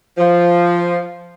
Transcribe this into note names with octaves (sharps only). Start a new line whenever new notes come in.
F3